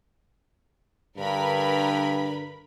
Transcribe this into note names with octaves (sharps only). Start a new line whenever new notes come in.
G2 D3 A#4 B4 B5